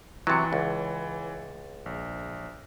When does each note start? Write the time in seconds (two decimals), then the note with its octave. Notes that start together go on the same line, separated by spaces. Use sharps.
0.27 C3 E3 F#3 A6 C#7
0.53 C#2
1.86 A#1